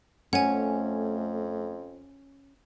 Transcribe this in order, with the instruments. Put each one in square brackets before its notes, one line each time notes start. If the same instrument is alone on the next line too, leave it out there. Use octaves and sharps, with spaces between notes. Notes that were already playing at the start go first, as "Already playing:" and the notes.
[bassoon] F2 [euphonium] A3 [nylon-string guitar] C#4 [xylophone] F#5 G#5